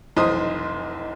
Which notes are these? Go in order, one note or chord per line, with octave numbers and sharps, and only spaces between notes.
F1 B1 E3 C5 C6 D#6